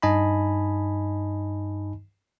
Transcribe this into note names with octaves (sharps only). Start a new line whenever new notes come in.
G2 D#4 D#5 G#5 A5 B5